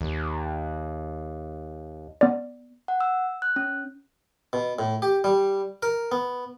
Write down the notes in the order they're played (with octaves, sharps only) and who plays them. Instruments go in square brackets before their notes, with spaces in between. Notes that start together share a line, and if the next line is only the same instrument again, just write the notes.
[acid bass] D#2
[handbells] B3 D5
[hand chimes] F#5
E6
F#6
C#4
[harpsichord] B2
A2
G4
G3
A#4
B3